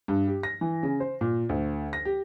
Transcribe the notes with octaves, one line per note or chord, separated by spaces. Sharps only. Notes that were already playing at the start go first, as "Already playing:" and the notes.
G2
G4
A#6
E3
C#3
C5
A#2
D2
A#6
G4